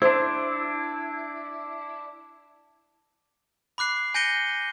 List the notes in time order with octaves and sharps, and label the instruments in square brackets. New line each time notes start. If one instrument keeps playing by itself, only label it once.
[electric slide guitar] D4 E4 [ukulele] C5
[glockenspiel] B5 D6 F#6 C7
G#5 G6 A#6 C#7 D#7 G7